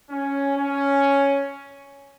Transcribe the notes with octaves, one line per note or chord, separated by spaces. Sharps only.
C#4
C#4